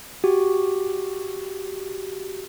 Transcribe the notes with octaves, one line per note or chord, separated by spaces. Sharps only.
F#4 G4